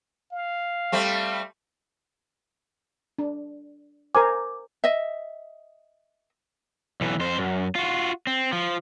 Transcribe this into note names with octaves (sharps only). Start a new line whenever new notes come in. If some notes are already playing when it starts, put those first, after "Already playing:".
F5
G3 A3 C4
D4
A#4 C5 G#5 D6
D#5 E5
B1 E3
F2 C5
F#2
F4 F#4
C4
F3